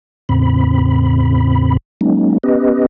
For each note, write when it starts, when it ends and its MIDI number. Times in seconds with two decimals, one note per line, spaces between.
0.29 1.77 40
0.29 1.77 45
0.29 1.77 49
0.29 1.77 60
0.29 1.77 83
2.01 2.38 54
2.01 2.38 56
2.01 2.38 58
2.01 2.38 61
2.01 2.38 63
2.43 2.86 59
2.43 2.86 61
2.43 2.86 67
2.43 2.86 71
2.43 2.86 75